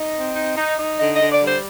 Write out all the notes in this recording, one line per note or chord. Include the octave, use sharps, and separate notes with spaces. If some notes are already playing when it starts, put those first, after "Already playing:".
Already playing: D#4 D#5
C4
D#4
D#4
D#4
D3 D#5
D#5
D3
D5
G3 C5